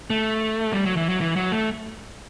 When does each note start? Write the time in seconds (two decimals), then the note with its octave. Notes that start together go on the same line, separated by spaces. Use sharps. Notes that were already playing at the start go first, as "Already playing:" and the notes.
0.10 A3
0.73 G3
0.86 F#3
0.97 E3
1.09 F#3
1.21 E3
1.36 F#3
1.52 A3